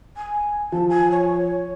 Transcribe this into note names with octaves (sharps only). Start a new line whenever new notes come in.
G#5
F3 A5
G#5
C#5